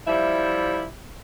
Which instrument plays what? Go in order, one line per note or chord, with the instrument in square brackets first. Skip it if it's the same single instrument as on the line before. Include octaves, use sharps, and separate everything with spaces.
[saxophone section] F3 G3 E4 E5